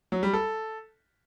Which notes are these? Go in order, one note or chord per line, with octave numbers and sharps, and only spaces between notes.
F#3
G3
A4